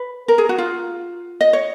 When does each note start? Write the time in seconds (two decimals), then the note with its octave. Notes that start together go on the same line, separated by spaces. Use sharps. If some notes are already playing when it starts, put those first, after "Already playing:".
Already playing: B4
0.28 A#4
0.38 G#4
0.49 F#4
0.58 F4
1.41 D#5
1.53 C#5